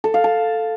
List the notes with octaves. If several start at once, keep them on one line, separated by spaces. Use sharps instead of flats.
A4
F5
A5